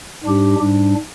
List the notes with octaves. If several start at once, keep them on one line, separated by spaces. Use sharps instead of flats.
G#2 G3 D4 G4
G#2 G3 D4